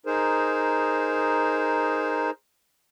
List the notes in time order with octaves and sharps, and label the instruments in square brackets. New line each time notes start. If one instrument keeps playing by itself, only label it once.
[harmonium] D#4 G#4 A#4 C5